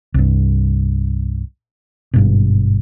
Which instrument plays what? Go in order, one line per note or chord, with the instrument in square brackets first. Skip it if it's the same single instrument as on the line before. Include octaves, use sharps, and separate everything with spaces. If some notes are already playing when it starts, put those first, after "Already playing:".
[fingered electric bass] C2 G2
G#1 G2 B2